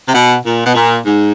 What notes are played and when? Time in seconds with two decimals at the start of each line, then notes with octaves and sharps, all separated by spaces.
0.06 C3
0.13 B2
0.44 A#2
0.64 B2
0.75 A#2
1.05 G#2